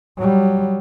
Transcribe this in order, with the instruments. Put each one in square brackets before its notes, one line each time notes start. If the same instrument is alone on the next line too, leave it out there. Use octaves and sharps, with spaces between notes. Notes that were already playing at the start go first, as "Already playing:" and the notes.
[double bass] F#3 G3